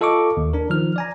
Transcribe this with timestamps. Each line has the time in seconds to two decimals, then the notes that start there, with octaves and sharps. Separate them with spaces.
0.01 F4 A4 D#5 F5 C#6 D6
0.37 D#2
0.53 D4 A#4
0.70 D#3 F3 F6
0.96 D5 G#5 A#5